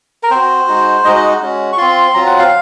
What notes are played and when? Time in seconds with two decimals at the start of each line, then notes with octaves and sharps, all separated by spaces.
0.23 A#4
0.31 C4 F#4 C5
0.67 G#3 D#4 F#4
1.04 G#3 D#4 F#4 D#5
1.16 D#5
1.41 G#3 C#4 F#4
1.72 C#6
1.77 C4 F4 C6
2.14 F#3 C4 F4 A#5
2.26 F#5
2.38 F5